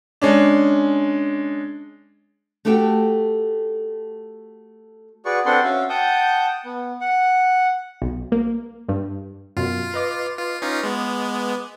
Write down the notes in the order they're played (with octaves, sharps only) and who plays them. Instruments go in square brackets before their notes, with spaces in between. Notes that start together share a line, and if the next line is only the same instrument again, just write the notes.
[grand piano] G#3 C#4 D4
[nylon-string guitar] A3 F#4 G4 A4 G5
[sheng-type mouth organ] F#4 G#4 B4 D5 C#6
C4 D4 A4 B4 F#5 C6
C#4 F#4 E5 F5
F#5 G5 A5 D#6 G6
B3
F#5
[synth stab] B1
A#3
G2
[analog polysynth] F#2 B2 [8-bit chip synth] F4
[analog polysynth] B4 D#5 D6
[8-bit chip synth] F4
C#4 D#4 F4
G#3 B3